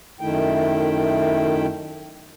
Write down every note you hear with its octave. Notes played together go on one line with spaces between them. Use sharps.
F#2 D#3 A3 E4 G5